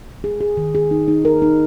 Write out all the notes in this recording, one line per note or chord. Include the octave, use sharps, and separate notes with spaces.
G#4
G#4
D#3
G#4
D#4
D#4
A#4
D#4